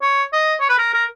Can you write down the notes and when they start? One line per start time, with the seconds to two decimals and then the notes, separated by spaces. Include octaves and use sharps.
0.02 C#5
0.33 D#5
0.60 C#5
0.69 B4
0.78 A#4
0.94 A#4